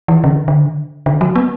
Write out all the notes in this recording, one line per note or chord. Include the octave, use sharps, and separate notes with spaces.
E3
C#3
D3
D3
D3
F#3
B3